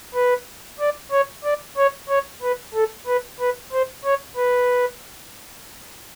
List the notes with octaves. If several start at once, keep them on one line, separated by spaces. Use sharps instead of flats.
B4
D5
C#5
D5
C#5
C#5
B4
A4
B4
B4
C5
C#5
B4